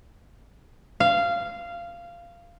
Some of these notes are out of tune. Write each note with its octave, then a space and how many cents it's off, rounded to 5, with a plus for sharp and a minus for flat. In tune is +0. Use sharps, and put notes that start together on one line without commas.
F5 -15